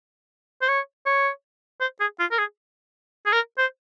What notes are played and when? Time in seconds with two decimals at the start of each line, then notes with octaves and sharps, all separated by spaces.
0.62 C5
0.68 C#5
1.06 C#5
1.81 C5
2.00 G#4
2.20 F4
2.31 A#4
2.39 G#4
3.26 G#4
3.32 A#4
3.58 C5